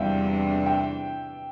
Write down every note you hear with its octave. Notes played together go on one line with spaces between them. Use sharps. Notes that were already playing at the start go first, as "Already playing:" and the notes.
Already playing: E2 C3 G3 D4 E5 F5 G5
E5 G5